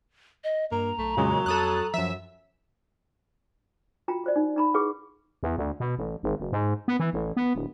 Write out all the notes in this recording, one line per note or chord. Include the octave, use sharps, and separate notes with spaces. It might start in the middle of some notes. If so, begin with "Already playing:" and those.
D#5
G2 A#3 A#5
B1 A3
F2 A#2 C#3 F#3 G#3
F2 A4 D#6 F#6
F#2 F3 E5
F4 F#4 G5 A#5
F4 C5 D5
D#4
D#4 A#5 B5
E4 G#4 B4 F#5 D6
E2
D2
B2
A1
G#1
F#1
G#2
B3
E3
A1
B3
D1